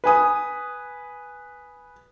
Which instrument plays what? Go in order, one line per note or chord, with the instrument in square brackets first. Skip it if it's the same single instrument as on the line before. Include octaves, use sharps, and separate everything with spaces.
[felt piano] B4 G#5 D#6